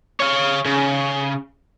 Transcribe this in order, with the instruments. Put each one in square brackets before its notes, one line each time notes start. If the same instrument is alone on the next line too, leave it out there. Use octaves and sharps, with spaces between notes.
[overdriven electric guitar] C#5 F5
C#3